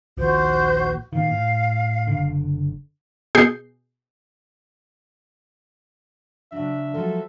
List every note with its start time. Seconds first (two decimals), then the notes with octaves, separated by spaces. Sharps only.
0.17 A#1 D#2 A#2 F#4 C5 G6
1.13 A#2 D#3 F5
1.32 A2
2.07 F#1 D3
3.35 B2 G#4 G6 C7
6.52 C#3 F#3 D4 E5
6.94 F3 F#3 G#3 A4